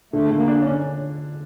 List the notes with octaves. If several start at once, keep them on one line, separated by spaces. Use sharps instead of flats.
D3 A3
D3
A#3
D4
C#4
D4